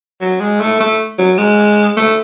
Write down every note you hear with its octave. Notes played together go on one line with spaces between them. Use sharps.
F#3
G#3
A3
A3
F#3
G#3
A3